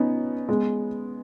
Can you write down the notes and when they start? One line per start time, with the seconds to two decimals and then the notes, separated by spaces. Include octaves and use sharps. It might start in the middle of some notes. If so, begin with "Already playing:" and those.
Already playing: B3 C#4 D#4
0.49 G#3 B3